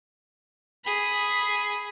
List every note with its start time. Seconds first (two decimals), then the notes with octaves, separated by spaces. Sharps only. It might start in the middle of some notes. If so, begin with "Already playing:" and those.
0.84 G#4 B5